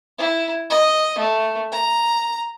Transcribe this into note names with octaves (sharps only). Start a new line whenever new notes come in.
E4
D#5
A3
A#5